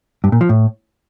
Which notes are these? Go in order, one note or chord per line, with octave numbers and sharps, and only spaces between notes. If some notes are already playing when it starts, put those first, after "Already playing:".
G2
A#2
F3
A2